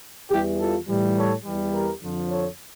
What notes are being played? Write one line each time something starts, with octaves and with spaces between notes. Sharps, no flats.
E2 E3 G3 E4 G4
F4 A4
A2 E3 G3
A4 C#5
E2 E3 G3
G4 A#4
F2 D3 F3
A4 C#5